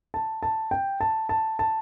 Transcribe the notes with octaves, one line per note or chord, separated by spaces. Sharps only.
A5
A5
G5
A5
A5
A5